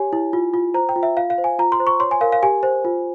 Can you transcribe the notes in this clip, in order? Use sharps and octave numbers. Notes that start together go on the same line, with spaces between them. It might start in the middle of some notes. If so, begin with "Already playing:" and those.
Already playing: G4 C#5 G#5
E4
F4
F4
C5 A#5
G5
F4
E5
F4 F5
F5
C5
G#5
F4 A#5
C6
C5
C#6
C#5 C6
G#5
A#4 F5
F5
G4 G#5
C5
F4